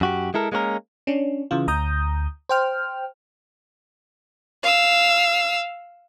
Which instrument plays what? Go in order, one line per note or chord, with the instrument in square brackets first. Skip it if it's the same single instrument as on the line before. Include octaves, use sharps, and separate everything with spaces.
[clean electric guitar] F#2 F#4 G4
G#3 E4 A4 A#4
G#3 A#3 C#4 F#4 A#4
[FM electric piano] C#4 D4
C#3 E3 F4
D2 A#5 D#6 G6
C5 G5 F6
[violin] F5 E6